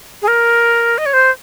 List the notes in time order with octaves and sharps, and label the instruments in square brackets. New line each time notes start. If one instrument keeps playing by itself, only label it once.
[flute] G#4
A#4
D#5
C#5
C5